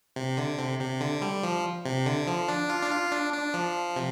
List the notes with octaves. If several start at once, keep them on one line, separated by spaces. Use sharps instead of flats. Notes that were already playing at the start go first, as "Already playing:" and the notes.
C3
D3
C3
C3
D3
G3
F3
C3
D3
F3
D4
F4
D4
F4
D4
D4
F3
C3